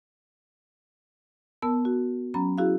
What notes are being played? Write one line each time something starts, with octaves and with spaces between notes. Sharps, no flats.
B3 A#4 A5 E6
F#4
F#3 C#4 A#5 B5
E4 F#4 G#4 F5